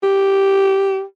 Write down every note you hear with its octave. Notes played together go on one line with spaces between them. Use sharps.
G4